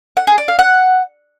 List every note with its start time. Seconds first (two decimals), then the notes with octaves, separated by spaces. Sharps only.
0.17 F#5
0.27 G#4
0.38 D5
0.48 F5
0.59 F#5